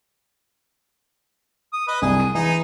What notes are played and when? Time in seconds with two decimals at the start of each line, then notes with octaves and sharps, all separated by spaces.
1.73 D#6
1.88 B4 D#5
2.02 C2 G#4 D#6
2.20 D#7
2.35 E3 D#4 G#4